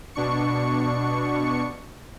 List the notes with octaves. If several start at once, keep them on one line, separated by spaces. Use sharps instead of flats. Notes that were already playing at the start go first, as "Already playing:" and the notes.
B2 D4 C#6 C#7